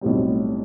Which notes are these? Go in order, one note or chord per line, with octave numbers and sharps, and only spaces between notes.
B1 A2 G3 C4